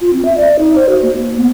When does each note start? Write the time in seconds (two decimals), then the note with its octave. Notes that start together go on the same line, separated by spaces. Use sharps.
0.01 F4
0.13 C4
0.25 E5
0.37 D5
0.59 D#4
0.75 C5
0.89 F#4
1.02 A#3
1.16 A#3
1.38 B3